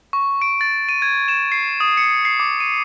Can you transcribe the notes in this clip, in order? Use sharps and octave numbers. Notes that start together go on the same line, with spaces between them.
C#6
D7
A6
D#7
G#6
E7
C7
D#6
C#7
C7
D6
D#7